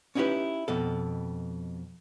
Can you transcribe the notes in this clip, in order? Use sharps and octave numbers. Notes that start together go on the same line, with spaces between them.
C#4 D#4 E4 F#4 G4 B4
F2 B2 A4